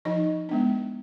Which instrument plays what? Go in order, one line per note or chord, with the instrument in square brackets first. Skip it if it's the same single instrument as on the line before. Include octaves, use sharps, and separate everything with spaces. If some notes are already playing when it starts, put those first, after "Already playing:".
[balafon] F3 D#4 D#5
G#3 B3 D4